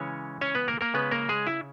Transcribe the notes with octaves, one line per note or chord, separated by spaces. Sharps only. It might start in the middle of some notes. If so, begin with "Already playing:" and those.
Already playing: C#3 E3 G#3 C#4 C#5
C#4 C#5
B3 B4
A#3 A#4
A#3 A#4
C#3 G#3 B3 C#4 B4
A#3 A#4
G#3 G#4
E4